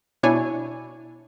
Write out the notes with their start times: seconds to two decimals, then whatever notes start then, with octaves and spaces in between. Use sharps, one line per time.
0.23 B2 D4 E4 C#5 G#5